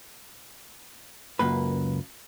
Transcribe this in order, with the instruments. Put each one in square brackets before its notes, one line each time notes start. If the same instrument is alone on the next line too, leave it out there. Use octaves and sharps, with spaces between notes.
[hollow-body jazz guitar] C#2 F#2 A#3 B4